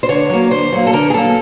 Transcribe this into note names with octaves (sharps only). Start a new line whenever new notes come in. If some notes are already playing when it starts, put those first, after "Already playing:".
C5
D3 C#5
F#3 A#3
D3 C5
F#3 A#3
A4
D3 A#4
G#4
F#3 A#3 A4